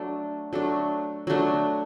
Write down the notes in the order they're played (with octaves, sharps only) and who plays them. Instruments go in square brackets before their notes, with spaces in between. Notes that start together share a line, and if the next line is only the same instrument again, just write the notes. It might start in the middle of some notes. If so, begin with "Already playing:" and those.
Already playing: [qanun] F#3 A3 D4
F#3 A3 D4
F#3 A3 D4